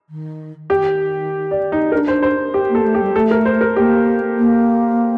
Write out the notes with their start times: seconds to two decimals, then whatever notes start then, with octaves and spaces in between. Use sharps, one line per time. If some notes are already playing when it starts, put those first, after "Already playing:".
0.09 D#3
0.70 D#3 G4
1.51 D5
1.72 D#4
1.92 D4 A#4
2.08 C5
2.22 C5
2.54 G4
2.69 A#3
2.75 A4
2.84 A3
2.95 G4
3.00 G3
3.14 A3 A4
3.31 A#4
3.45 C5
3.61 A#4
3.76 A#3 G4
4.38 A#3